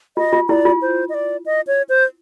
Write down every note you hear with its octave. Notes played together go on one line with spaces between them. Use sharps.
F4 D#5
F4
E4 D5
F4
C5
D#5
D5
D#5
C#5
C5